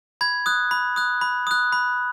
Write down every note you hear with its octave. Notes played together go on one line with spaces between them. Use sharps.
B5 G#6
D#6 F#6
B5
D#6 F#6
B5
D#6 F#6
B5